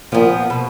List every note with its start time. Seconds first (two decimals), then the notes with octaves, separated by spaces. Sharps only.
0.12 A#2 F3 B3
0.50 B2